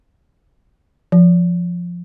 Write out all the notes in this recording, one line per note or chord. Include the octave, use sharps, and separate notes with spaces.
F3